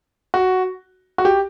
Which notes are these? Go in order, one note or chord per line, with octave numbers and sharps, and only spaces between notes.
F#4
F#4
G4